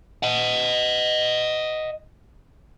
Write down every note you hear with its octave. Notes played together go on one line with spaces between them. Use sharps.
D#5 F#5